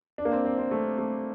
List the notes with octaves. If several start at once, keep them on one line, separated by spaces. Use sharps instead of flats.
D4
A#3
C4
C4
C4
A3
A3